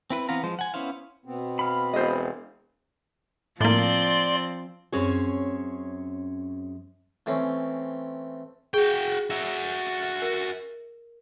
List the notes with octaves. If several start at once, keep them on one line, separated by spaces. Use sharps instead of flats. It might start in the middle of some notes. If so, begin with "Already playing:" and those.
C4 E4 B4
E3 B3 C4 F5 A#5
F3 G#3 C5
F#5 G#5
B3 C#4 E4 C5 F5
B2 B3 C4
F5 B5
E1 C5 D#5
A2 F3 A#3 C4 D5 C6
F#2 C4 C#4 G#4 C#5
E3 A3 C4 C#4
F#4 G#4 G5
F#4 E5
A#4